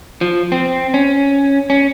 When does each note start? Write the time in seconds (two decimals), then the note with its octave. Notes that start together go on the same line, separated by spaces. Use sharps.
0.21 F3
0.52 C4
0.94 C#4
1.70 C#4